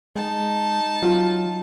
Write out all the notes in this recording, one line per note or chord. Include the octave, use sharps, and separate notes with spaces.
G#3 D#4 A5
F#3 F4